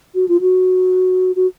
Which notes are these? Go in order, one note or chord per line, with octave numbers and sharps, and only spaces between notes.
F#4
F4
F#4
F#4